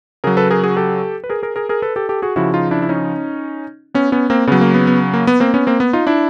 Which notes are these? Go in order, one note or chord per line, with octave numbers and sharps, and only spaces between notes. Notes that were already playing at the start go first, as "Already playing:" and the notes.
C#3 F#3 G#4 A#4
A4 B4
G#4 A#4
F#4 G#4
G4 A4
B4
G#4 A#4
G#4 A#4
G#4 A#4
G#4 A#4
A4 B4
G4 A4
G4 A4
F#4 G#4
C#3 F3 E4 F#4
D#4 F4
D4 E4
E4
C#4 D#4
B3 C#4
B3 C#4
A#3 C4
C#3 F#3 B3
A#3
B3
B3
A#3
B3
A#3 C4
B3 C#4
A#3 C4
B3
D#4 F4
D4 E4